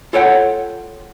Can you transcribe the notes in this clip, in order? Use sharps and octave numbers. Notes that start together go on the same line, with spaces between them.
F4 A4 C#5 D5 F#5 G5